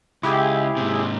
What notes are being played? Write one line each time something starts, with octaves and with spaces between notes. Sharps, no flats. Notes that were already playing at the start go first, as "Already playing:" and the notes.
C#2 E4 G4 G#4
G#2 C3